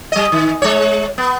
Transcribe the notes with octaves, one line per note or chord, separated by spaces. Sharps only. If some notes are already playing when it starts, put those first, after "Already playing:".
G3 D#5
D#3
G#3 C#5
B3